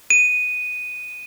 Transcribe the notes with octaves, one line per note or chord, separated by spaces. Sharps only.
D#7